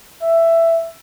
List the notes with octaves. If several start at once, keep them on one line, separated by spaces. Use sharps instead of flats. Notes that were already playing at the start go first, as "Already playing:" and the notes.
E5